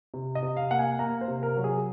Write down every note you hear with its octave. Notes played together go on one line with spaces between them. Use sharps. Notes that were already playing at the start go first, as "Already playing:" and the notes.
C3
D#5
C3
F5
A#3 F#5
G#5
A#3 A#5
C5
C3
A#4
F#3
G#4